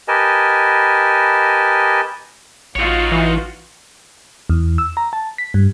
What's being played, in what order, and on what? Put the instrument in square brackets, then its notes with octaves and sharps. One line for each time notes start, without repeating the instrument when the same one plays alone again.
[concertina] G4 A#4 B4 D#5 G#5 A5
[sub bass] A1 [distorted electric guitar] D#4 C#5 [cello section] F4 F#4
[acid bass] E3
[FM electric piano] E2
E6
A#5
A5
B6
G2